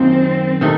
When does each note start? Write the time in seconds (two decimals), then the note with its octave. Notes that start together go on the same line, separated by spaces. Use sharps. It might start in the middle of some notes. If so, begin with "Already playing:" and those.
Already playing: F#2 D#3 A#3 C4 F4
0.61 C3 D#3 A3